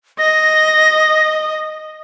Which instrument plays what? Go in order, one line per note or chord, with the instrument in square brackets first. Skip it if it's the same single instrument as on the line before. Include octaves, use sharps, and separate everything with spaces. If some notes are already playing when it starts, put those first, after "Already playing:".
[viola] D#5 [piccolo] A#6